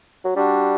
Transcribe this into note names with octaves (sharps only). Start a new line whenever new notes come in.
F#3
G3 D4 F#4